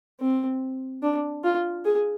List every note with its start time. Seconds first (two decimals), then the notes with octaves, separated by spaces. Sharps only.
0.20 C4
1.03 D4
1.44 F4
1.85 G#4